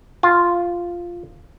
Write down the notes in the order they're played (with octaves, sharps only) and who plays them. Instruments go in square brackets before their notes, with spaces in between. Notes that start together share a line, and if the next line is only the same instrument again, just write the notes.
[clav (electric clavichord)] F4